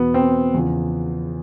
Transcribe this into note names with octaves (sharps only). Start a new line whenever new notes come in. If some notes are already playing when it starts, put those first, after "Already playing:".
Already playing: E2 B2 B3
C4
E2 C#3 F3